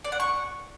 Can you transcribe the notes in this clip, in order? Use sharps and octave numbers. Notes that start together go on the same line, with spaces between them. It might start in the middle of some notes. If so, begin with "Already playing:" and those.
D5
F#5
C#6